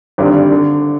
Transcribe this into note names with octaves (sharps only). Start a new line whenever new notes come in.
G#1 G2 D3 G3
D3